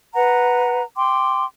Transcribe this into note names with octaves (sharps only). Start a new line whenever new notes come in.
B4 F#5 A#5
G5 C6 D6